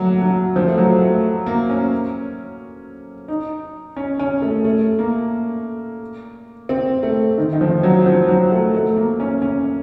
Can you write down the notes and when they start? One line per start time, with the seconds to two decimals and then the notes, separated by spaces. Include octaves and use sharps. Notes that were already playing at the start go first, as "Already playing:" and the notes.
Already playing: F#3 A3 A#3
0.22 F#3
0.56 F3
0.68 A3
0.78 F#3
1.01 A3
1.46 A#3
1.69 C#4
3.28 D#4
3.96 C#4
4.19 C#4
4.42 A3
4.65 A3
4.99 A#3
6.69 C4
7.03 A3
7.38 D#3
7.53 D#3
7.61 F3
7.83 F#3
8.06 F3
8.29 F#3
8.52 A3
8.74 A3
8.97 A#3
9.20 C#4
9.42 C#4